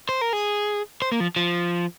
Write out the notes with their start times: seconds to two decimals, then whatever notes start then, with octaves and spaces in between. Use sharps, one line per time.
0.09 C5
0.21 A#4
0.33 G#4
1.02 C5
1.12 A#3
1.20 F3
1.36 F3